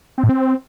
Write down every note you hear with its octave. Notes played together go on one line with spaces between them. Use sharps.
C4
A2
C4